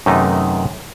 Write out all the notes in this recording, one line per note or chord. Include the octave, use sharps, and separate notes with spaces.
F#2 C3 D#3 A3 D#4 B4